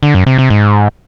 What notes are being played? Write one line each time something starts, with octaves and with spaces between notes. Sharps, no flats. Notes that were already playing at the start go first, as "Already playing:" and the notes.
D3
F#2
C3
C3
G#2